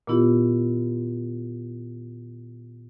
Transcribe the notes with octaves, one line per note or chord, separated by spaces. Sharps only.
A#2 D#3 B3 E4 F4 G4